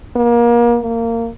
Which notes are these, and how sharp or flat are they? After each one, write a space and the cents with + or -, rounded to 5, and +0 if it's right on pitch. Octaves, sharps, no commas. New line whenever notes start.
A#3 +30
A#3 -20